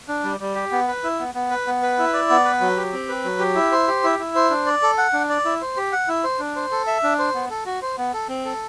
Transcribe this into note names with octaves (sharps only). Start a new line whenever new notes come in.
D4
G3
G3
G4
B3
B4
E4
B3
B3
B4
B3
B4
E4
D5
B3
B4
F#3
G4
C4
B4
F#3
G4
E4
C5
G4
E4
E4
C5
D4
D5
A4
F#5
D4
D5
E4
C5
G4
F#5
E4
C5
D4
C5
A4
E5
D4
C5
B3
A4
F#4
C5
B3
A4
C4
A4